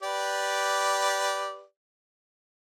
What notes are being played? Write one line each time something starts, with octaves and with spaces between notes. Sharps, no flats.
G4 B4 D5